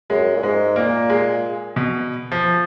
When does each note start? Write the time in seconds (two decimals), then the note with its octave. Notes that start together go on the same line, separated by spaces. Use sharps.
0.10 F#2 G#3
0.36 A#2
0.43 G#2 G#3
0.76 A#2 A#3
1.10 G#3
1.76 B2
2.32 F3